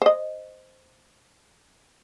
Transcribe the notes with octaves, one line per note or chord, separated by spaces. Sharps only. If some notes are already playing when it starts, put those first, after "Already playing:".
C5 D#5